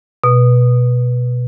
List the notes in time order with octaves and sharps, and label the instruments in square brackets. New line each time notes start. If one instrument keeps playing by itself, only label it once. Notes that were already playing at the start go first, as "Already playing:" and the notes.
[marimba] B2